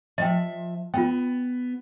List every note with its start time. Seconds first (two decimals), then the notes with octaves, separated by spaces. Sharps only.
0.18 F3 D#5 E5 G5
0.94 B3 F4 G5